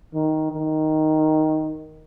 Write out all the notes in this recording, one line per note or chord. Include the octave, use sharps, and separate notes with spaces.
D#3
D#3